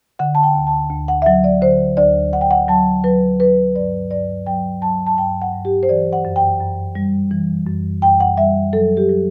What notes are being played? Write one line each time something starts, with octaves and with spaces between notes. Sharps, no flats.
D3 F#5
A5
G5
D2
A5
D2
F#5
E5
F#3 F#5
D5
D3 C5
D2 D5
D2 F#5
G5
F#5
F#3 A5
F#3 B4
F#3 B4
G2 D5
G2 D5
F#3 G5
F#3 A5
A5
G2 G5
F#5
G2
G4
C5
E3 D5
F#5
F#2
G5
F#2
G3
E3
F#2
F#2 G5
F#5
G3 E5
F#3 A4
G4
F#3